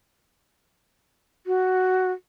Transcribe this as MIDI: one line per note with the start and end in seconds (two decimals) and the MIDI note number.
1.47 2.12 66